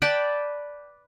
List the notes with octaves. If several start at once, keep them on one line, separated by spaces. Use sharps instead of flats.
B4 D5 G5 A5